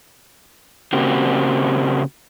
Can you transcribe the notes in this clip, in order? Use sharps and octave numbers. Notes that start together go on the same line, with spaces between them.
C#3 A#3 C4 F#4 G4